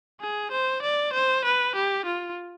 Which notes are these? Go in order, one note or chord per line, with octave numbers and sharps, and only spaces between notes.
G#4
C5
D5
C5
B4
G4
F4